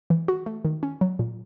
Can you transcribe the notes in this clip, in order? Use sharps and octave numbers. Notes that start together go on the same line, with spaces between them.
E3
F#4
A3
D#3
C#4
F#3
A#2